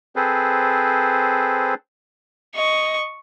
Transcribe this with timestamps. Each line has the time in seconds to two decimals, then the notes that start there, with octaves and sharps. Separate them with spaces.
0.16 C4 G#4 A4 B4 C5
2.55 D#5 C#6